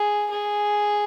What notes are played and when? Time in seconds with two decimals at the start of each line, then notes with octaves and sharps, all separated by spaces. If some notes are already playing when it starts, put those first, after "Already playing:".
Already playing: G#4
0.31 G#4